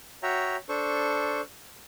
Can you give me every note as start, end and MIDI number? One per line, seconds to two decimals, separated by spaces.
0.23 0.56 66
0.23 0.56 73
0.23 0.56 76
0.23 0.56 79
0.23 0.56 82
0.69 1.41 62
0.69 1.41 69
0.69 1.41 72
0.69 1.41 85